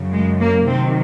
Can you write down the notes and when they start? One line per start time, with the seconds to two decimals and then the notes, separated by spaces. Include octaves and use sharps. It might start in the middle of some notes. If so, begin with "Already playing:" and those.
Already playing: F#2 C#3
0.12 G#3
0.40 A#3
0.67 C3 D#3 F#3 C4